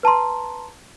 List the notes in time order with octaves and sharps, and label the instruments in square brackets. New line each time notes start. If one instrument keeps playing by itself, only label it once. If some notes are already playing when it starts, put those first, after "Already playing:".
[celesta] B4 A5 A#5 C6